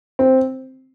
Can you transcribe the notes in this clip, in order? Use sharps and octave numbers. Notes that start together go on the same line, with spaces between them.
C4